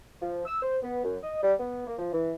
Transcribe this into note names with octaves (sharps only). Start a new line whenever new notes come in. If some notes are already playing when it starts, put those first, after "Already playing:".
F3
E6
C5
B3
F#2
D#5
G3
B3
A#3
F3
E3